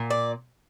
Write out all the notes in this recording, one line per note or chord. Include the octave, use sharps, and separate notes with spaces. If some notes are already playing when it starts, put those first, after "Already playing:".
Already playing: A#2
D5